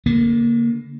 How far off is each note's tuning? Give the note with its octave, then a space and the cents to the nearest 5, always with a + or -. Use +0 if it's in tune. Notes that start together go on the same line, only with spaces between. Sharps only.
D3 -30 A#3 +5